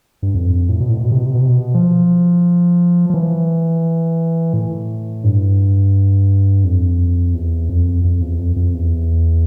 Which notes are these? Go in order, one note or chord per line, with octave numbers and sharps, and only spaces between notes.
G2
F2
A2
B2
A2
B2
C3
B2
C3
B2
C3
B2
F3
F3
E3
A2
G2
F2
E2
F2
F2
E2
F2
F2
E2